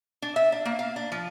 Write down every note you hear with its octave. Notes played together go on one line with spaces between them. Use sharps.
D4
E5
D4
A#3
F5
D4
F3